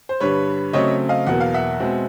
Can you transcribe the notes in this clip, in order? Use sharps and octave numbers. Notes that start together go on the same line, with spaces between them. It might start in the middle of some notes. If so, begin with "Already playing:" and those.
C5
G2 D3 G3 B4 C#5
C#3 F#3 A3 C4 C#5 D#5
D#5 F5
E2 B2 F#3 A#3 F#5
F5
E5 F#5
B2 G#3 C4